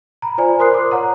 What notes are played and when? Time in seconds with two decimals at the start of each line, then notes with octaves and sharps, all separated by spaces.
0.22 A#5 B5
0.38 F4 C5 D5 G#5
0.59 A#4 C5 C6 D#6 F#6 C7
0.74 D6
0.91 C#5 F#5 A#5